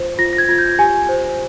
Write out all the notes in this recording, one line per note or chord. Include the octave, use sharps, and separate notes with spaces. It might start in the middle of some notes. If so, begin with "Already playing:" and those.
Already playing: F4 C5
F4 A#6
A#6
G#6
F4 G#6
G6
G4 G#5
C5